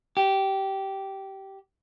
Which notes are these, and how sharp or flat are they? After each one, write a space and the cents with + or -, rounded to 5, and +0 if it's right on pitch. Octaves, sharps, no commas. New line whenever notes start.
G4 -15